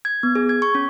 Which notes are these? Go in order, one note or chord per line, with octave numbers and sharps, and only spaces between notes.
G#6
B3
G#4
G#6
C#6
C#4